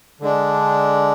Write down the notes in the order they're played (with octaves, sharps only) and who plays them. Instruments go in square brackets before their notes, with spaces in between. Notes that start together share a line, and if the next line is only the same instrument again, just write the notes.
[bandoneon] D3 G#3 D4